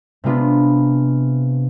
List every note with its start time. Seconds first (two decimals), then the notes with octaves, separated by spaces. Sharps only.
0.24 C3 G#3 B3 D4 F4